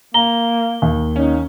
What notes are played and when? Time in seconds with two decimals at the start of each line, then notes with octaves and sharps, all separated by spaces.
0.14 A#3 A#5 G7
0.82 D#2
1.16 C#4 D#4